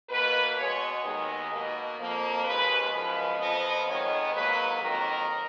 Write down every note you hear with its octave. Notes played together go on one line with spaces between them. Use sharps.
B2 A#3 B4
B2 G#3 B3 C#5
D#2 D#3 G#3 B3 D#5
B2 A#3
F2 F3 A#3
D#2 C#3 G#3 B4
F#2 F3 G#3 B4
F2 F3 B3 D#5
F2 D#3 G#3 B3 C#5
G#2 F#3 A#3 B4
F2 D#3 F#3 A#3 A#4